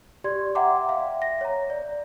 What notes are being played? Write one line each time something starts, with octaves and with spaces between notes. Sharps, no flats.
G4 D5 C6 G#6
E5 F#5 G5 A#5 C6 D6
E5 F5
A#6
C#5 A#5
D5